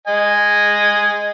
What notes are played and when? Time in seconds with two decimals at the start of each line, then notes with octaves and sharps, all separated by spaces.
0.07 D#5 G#5